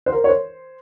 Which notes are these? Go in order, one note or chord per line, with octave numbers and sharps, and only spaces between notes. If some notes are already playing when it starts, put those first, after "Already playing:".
C5
A#4
C#5
C5